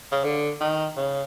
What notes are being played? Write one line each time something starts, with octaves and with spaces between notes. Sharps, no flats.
C#3
D3
D#3
C#3